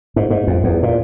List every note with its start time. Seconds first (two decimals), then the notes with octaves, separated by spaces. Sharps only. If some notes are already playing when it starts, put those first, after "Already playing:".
0.16 G#2
0.30 G#2
0.47 F2
0.64 E2
0.83 A#2